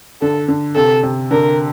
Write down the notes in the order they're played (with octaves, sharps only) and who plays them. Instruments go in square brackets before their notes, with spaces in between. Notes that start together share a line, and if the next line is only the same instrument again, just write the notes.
[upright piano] D3 [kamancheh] A4
[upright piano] D3
[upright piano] C3 [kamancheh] A4
[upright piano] C3
[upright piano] D3 [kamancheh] A#4